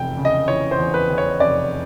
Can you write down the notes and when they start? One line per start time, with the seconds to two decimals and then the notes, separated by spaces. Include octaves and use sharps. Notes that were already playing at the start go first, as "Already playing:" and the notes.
Already playing: F1 E2 G5
0.17 C#3
0.25 D#5
0.48 E3 C#5
0.71 C5
0.78 E2
0.94 B4
1.10 E2
1.18 C#5
1.40 F1 D5